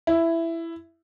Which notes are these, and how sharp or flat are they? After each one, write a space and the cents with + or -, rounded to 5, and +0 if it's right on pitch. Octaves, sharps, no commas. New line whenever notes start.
E4 +10